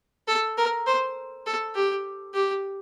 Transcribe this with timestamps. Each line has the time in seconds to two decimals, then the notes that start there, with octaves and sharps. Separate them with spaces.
0.28 A4
0.57 A#4
0.87 C5
1.46 A4
1.75 G4
2.34 G4